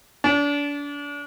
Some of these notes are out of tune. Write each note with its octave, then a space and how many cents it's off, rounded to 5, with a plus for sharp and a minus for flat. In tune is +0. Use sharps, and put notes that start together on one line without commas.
D4 -35